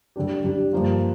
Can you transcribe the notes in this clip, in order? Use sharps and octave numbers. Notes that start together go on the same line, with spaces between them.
D3 G3 D4 G4
D3 G3 D4 G4
G2 F3 A#3 F4